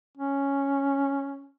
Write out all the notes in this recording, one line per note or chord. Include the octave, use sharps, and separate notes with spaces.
C#4